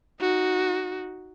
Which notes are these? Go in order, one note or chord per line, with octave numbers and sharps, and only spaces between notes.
D#4 F#4